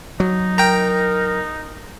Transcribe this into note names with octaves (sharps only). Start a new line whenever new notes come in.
F#3 D#4
A#4 G5 A#5